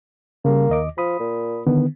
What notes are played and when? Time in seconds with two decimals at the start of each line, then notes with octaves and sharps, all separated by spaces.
0.45 C#3 G3 A#3
0.69 D#2 D#5 D6
0.98 F3 B5 D#6
1.19 A#2
1.67 D3 D#3 B3